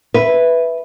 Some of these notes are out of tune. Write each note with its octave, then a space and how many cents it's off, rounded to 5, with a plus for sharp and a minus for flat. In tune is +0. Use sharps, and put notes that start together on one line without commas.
B4 +0 E5 +0